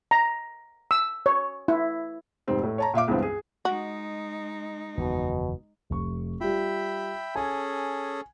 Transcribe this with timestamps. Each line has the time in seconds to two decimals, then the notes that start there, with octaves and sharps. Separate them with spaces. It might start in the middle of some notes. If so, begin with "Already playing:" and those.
0.11 A#5
0.91 E6
1.26 C#5
1.68 E4
2.47 F1 G#2 C4
2.63 A2
2.78 C#5 A5 A#5
2.94 A#2 E5 F5 D6
3.08 C#2 G2 E3 B3 C4
3.22 G#4
3.65 G#3 D#4 F#4
4.97 F#1 E2 B2 D#3
5.90 F1 C#6
6.41 G3 F4 E5 G5 B5
7.36 C#4 G#4 A4 G#5